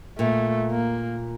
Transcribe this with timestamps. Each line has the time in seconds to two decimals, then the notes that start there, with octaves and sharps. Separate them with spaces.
0.19 A#2 A3
0.71 A#3